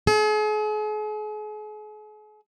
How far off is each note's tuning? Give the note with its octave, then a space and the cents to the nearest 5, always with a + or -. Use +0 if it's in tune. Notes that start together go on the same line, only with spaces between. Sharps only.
G#4 +40